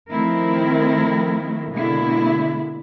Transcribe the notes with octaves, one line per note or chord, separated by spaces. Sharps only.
D#3 F3 A3 C4 E4 A#4
B2 D3 G#3 A#3 E4